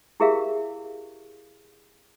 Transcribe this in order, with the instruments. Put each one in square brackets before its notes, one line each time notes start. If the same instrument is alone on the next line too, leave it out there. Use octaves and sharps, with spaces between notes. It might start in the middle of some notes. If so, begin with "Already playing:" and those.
[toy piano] E4 G4 G#4 A#4 E5 F5